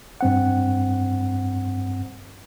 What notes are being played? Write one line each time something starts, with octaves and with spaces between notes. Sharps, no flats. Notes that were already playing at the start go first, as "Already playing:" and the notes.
G2 C4 F#5